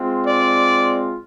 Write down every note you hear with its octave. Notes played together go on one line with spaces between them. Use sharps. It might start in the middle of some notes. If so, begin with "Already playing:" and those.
Already playing: G#3 C4 F4
D5